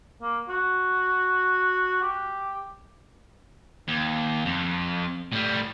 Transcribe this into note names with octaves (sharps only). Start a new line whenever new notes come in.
A#3
F#4
G4
D#2
F2
A2 G3